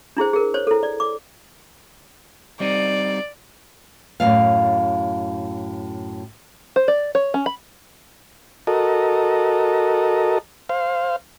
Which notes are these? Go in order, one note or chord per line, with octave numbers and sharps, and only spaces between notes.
D4 E4 G#4 C5
G#4 A#4
C5 C#5
E4 A4
D5
D6
G3 C4 D#4 D5
F#2 A2 A3 F5
C5
D5
C#5
C#4
B5
F#4 A4 A#4 D#5
C5 F5